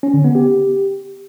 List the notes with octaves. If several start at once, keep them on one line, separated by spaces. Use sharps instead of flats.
C#4
D3
B3
G4